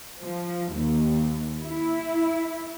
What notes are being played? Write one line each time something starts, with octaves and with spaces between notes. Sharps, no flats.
F3
D#2
E4